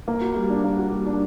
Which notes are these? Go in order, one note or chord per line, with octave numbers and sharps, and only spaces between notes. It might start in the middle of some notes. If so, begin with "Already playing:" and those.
A#3
F#4
G3
D4
A#3
F#4
G3
D4